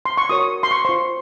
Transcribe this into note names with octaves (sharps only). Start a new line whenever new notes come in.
C6
C#6
F#4 A#4 C#5 D#6
C6
C#6
F4 C5 C6